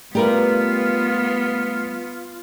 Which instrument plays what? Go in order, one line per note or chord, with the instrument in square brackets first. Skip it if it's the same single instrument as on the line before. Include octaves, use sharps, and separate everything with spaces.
[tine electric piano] G3 A3 [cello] B3 [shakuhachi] F4 [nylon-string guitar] G4 A#4 B4